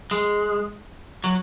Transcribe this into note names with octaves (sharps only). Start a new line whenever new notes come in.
G#3
F#3